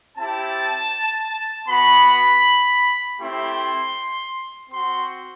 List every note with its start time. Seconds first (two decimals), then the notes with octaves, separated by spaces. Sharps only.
0.17 C4 E4 G4 A5
1.68 B3 F#4 B5
3.20 A3 C4 E4 G4 C6
4.70 C4 F#4 C6